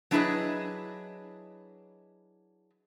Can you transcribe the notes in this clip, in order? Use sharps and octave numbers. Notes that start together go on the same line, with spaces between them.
F#3 D4 E4 G#4 B4 D#5